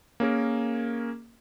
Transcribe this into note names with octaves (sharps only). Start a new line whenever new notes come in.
A#3 C#4 G#4 A#4